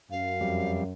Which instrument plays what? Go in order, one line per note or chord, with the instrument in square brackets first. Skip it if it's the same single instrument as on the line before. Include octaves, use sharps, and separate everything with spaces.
[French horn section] F#2 [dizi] F5
[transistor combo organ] F2 G3